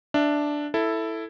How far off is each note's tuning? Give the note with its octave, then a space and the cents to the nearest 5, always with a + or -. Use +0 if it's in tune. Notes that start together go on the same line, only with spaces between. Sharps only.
D4 +0 E5 +0
E4 +0 A4 +5